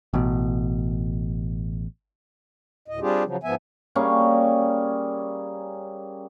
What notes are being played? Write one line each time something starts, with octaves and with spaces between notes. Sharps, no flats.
A1 B2
D2 A2 D#5
G3 C4 D4 F4 G4 G#4
C#3 F3 F#3
G#2 F3 B3 E5 G#5
G3 A#3 C#4 G#4